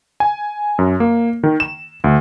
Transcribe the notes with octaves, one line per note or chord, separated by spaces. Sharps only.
G#5
F#2
A#3
D#3
E7
D2